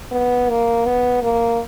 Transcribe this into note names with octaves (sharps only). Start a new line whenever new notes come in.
B3
A#3
B3
A#3